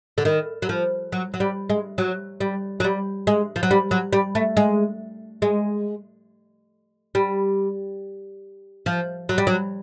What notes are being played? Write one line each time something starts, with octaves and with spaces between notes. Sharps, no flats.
D3
D#3
F#3
F3
F#3
F#3
G3
G#3
F#3
G3
F#3
G3
G#3
F3
F#3
G3
F#3
G3
A3
G#3
G#3
G3
F3
F#3
G3
F#3